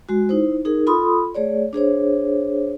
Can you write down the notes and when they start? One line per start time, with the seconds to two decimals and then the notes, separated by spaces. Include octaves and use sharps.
0.09 G#3 F#4
0.29 D#4 E4 C5
0.65 D#4 G#4 A#4
0.87 F4 A4 B5 C6 D#6
1.35 A3 G#4 C#5 D5
1.73 D4 G#4 C5 C#5